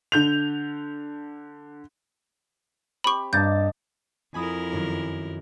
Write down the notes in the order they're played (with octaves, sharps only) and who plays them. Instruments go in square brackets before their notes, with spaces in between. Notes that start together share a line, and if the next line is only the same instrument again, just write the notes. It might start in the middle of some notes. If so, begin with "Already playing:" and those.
[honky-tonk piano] D3 G6 F7
[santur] C4 G4 [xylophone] B5 C#6
[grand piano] G2 A6 [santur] A#3 D#5 A5 [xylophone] G6
[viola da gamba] F2 E4 A#4 [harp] G#5 B5 D#6
[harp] F#2 D#3